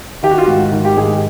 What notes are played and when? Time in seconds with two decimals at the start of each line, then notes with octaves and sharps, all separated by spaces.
0.23 D#3 G4
0.31 F#4
0.38 F4
0.46 G#2 F#4
0.72 D#3
0.85 G4
0.97 G#2 G#4